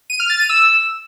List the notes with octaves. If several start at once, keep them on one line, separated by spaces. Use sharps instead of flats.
D#7
F6
A6
D#7
E6